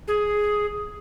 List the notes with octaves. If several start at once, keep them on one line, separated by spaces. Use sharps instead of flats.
G#4